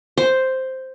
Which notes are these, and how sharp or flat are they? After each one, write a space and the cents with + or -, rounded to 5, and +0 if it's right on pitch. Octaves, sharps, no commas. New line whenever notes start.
C5 +0